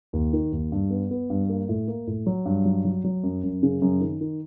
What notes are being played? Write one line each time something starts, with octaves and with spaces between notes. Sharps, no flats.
D#2
D#3
D#2
G2
B3
B3
G2
A#3
A2
A#3
A2
F#3
G2
F#3
F#3
F#3
F#2
F#2
C#3
F#2
D#3
D#3